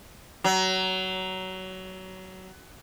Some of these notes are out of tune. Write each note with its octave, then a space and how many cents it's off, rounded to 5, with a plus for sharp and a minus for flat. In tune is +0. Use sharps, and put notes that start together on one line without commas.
F#3 +20